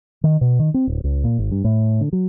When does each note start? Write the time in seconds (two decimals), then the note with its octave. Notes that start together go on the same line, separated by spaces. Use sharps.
0.24 D#3
0.41 B2
0.59 D#3
0.74 C4
0.87 D1
1.04 C#2
1.24 A#2
1.39 G#1
1.51 G2
1.64 A2
2.01 D3
2.13 F#3